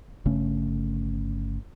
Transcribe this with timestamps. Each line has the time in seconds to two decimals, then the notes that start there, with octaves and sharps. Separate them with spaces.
0.25 G1 C#3 A3 C#4